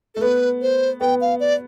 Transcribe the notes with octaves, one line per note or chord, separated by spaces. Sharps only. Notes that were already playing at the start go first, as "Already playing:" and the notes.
A3 A4
B3 B4
C5
B3 G5
F5
D5